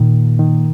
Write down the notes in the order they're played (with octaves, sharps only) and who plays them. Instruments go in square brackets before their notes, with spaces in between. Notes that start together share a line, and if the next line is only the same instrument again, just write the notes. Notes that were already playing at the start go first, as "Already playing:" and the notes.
Already playing: [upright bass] A#2 [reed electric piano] D#3
[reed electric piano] D#3